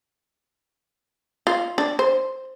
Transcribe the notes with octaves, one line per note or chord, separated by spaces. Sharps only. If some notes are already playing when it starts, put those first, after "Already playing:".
F4
D4
C5